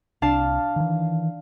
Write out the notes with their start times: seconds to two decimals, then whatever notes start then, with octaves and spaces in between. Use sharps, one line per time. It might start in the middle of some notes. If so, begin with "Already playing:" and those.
0.22 C2 D4 F5 A5
0.76 D#3 E3